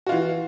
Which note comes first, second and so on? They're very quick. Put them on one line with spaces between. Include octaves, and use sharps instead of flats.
F#4 F4 E3